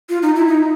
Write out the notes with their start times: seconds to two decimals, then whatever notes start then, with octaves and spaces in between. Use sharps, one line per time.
0.09 F4
0.22 D#4
0.35 E4
0.48 D#4